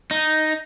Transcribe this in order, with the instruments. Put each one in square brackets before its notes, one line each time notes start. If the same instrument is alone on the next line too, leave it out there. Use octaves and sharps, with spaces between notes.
[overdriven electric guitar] D#4